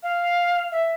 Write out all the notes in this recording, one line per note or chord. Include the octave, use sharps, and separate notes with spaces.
F5
E5